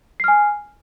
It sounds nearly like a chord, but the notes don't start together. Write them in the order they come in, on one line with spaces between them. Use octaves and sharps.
C7 F6 G#5